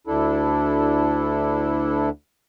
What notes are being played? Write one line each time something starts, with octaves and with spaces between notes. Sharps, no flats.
D2 D4 E4 A4